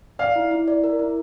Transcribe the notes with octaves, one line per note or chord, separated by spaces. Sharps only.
D5 F5
E4
E4
D5
A#4
E4